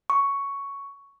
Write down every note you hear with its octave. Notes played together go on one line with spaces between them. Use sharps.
C#6